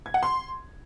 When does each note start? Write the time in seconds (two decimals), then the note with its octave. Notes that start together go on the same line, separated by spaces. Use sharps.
0.06 G#6
0.14 F#5
0.23 C6